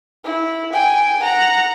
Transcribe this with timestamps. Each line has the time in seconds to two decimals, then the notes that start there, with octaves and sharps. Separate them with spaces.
0.25 E4
0.74 G5 G#5
1.23 F#5 A#5